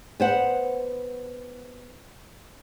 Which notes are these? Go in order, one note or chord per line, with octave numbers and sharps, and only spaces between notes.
B3 C5 F#5